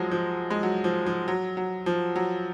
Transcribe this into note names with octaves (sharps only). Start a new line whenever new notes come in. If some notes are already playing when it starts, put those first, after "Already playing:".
Already playing: F3 F#3 G#3
F3
G#3
F#3
F3
F3
F#3
F#3
F3
F#3